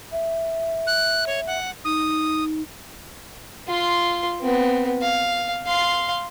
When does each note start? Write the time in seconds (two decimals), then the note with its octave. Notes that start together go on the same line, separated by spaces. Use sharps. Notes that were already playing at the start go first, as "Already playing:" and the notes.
0.12 E5
0.87 F#6
1.27 C#5
1.47 F#5
1.85 D#4 D#6
3.68 F4 C6
4.41 B3 C4
5.02 F5
5.66 F5 C6